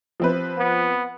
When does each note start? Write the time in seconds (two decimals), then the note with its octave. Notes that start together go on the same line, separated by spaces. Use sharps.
0.20 F3 C4 B4
0.58 B3